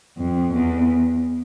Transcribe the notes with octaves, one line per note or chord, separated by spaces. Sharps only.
F2
E2